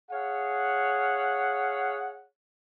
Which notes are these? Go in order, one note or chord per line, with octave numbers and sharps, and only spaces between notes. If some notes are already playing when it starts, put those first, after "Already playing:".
G#4 C#5 F5 F#5